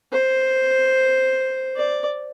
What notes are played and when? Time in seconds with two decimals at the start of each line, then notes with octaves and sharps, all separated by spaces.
0.12 C5
1.76 D5